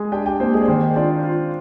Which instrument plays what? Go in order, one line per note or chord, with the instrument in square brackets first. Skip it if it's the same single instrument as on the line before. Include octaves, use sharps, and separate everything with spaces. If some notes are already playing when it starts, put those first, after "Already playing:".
Already playing: [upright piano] G#3 [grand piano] G#4 G#5
[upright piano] D4 [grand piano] G4 G5
[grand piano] G4 G5
[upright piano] A#3 [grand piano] C4 C5
[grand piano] G#3 G#4
D5
[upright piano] D#3 [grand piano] C4 C5
[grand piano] D4 D5 [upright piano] F4
[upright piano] F4